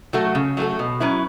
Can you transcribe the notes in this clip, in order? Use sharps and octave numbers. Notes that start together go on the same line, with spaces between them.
F#3 A3 F#4 A4
C#3
F#3 A3 F#4 A4
B2
F#3 C#4 E4 B4